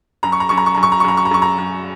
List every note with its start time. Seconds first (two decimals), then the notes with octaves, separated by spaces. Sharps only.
0.23 F#2 A#5
0.32 C#6
0.40 A#5
0.49 F#2 C#6
0.57 A#5
0.66 C#6
0.74 F#2 A#5
0.83 C#6
0.92 A#5
1.00 C#6
1.04 F#2 A#5
1.17 C#6
1.25 A#5
1.31 F#2 C#6
1.42 A#5
1.58 F#2